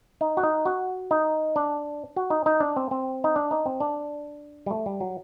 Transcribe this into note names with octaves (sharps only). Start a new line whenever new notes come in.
D#4
F#4
D#4
F#4
D#4
D4
F#4
D#4
D#4
D4
C4
C4
D#4
D4
D#4
C4
D4
G3
A3
G3
F#3